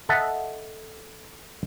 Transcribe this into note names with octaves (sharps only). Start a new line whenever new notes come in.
A4 D#5 E5 F#5 A5